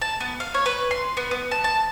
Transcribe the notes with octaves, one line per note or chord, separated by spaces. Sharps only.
A5
B3
F5
C#5
B4
C6
B3
B3
A5
A5